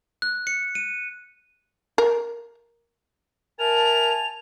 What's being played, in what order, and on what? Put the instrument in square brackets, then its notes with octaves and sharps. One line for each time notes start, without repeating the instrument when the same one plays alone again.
[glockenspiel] F#6
C#7
D#7
[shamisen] A#4
[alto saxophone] A#4 [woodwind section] E5 G#5 A5 [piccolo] F7